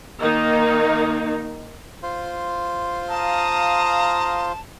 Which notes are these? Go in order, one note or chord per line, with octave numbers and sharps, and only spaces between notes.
D#3 A#3 D#4
F4 C5
F5 A5 A#5 D#6